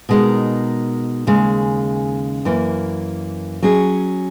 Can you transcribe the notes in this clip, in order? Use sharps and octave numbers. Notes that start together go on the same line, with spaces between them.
B2 G#3 D#4 A#4
D#2 C#3 G#3
F#2 E3 A#3
F#3 C#4 G#4